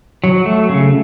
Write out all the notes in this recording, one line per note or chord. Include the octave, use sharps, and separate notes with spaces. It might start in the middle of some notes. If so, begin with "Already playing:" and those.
F#3
A3
C#3